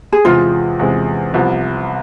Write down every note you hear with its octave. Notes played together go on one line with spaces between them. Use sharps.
G#4
E2 C3 G#3 C4 F4
E2 C3 G#3 C4
C2 C3 F3 B3